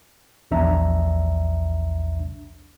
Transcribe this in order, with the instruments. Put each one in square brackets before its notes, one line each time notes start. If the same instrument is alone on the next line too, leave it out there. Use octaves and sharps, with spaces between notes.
[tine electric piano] A#1 E2 D4 E5 A#5